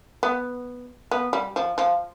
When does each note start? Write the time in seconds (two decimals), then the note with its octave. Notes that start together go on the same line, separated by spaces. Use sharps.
0.23 B3
1.11 B3
1.33 G3
1.56 F3
1.78 F3